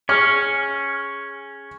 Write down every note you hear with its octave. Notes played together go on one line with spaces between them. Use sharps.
C#4 G#4 F6